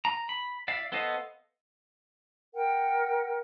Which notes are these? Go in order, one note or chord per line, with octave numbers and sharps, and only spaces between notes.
A#5
B5
D5 E5 F5
B3 A4 C5 D#5 F5
A#4 F#5 G5